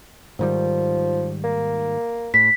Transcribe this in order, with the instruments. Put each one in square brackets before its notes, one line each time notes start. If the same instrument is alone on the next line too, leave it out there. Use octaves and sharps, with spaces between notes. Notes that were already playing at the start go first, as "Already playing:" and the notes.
[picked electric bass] G#2 D#3 G3 [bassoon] F3
[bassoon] A#3
[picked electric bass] A2 [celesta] B6